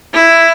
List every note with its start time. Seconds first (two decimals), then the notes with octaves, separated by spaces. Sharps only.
0.13 E4